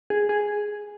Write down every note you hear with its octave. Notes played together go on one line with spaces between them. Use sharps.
G#4
G#4